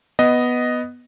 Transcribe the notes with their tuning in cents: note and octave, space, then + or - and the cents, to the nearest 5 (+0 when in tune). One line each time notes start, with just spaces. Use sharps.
B3 +0 D#5 +0